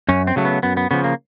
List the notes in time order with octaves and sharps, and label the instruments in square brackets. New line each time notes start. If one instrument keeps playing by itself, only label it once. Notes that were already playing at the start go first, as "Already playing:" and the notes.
[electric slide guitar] F#2 C#4
C4
C#3 F#3 A3
B3
F#2 B3
B3
C#3 F3 B3
A#3